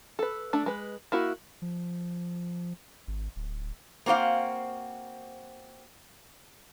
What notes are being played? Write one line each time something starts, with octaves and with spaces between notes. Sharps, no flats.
A4 B4
A3 D4
G#3 B4
A#3 E4 F#4
F3
G#1
D1
A#3 C4 F#4 C5 F5